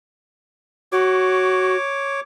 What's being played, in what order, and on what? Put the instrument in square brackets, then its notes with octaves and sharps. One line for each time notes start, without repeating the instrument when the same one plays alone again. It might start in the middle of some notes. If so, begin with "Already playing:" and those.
[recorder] F#4 [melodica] C#5 D6